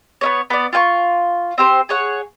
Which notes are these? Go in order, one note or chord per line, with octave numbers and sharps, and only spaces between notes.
B3 C#4 C#5
B3 D5
F4 F5 G#5 C#6
C4 G4 C5
G#4 C#5 F#5